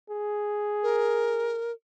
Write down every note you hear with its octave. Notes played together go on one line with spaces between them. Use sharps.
G#4
A#4